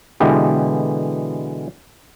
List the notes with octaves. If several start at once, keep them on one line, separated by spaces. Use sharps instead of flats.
B2 D3 E3 G#3 B3 G4